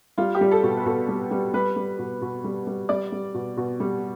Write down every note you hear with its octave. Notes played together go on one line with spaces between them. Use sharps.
G3 F4
G4
G3
A4
B2
B4
B2 A4
G3
G3
G3 B4
G3
B2
B2
G3
G3
G3 D5
G3
B2
B2
G3